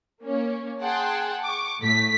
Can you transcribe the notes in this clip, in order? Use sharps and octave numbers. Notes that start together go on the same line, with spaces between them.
A#3 C#4
G#4 F#5 G5 A5 C6
C#6 D6
A2 A3 B6